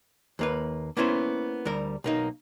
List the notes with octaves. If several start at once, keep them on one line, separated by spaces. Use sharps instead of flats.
D#2 A#3 B4
A#3 B3 C#4 E4 C5
D2 G3 A#4
B1 A#3 D#4